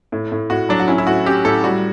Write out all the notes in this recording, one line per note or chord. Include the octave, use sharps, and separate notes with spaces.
A2
A2
A2 F#4
F#3 D4
F#4
C#4 E4
E4
A2 F#4
C#4 G4
A2 A4
G3 F#4